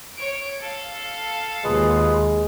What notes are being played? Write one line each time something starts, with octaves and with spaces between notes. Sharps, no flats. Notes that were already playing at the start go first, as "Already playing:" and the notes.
C#5 D7
A4 F5
D#2 G#3 F4 G#4 B4